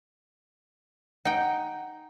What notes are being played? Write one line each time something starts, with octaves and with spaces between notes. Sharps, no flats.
D#4 F#5 G5